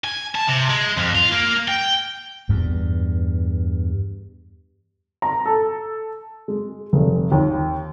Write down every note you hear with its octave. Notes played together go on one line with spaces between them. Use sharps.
G#5
A5
C3
G#3
F2
F4
A#3
G5
E2 G2
A#5
A4
G#3
F1
D#2